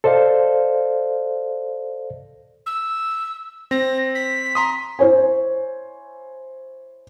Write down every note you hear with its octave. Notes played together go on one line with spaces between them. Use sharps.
A4 C5 D5 D#5 F5
E6
C4 A#6
B6
A#5 C6 D#6
E4 C5 C#5 G#5